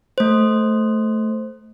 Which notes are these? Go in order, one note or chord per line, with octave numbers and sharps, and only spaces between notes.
A3 C5